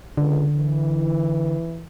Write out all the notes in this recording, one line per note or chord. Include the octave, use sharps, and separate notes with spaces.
C#2 D3
E3